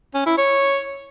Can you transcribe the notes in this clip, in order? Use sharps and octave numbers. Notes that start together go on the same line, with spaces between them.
C#4
E4
C#5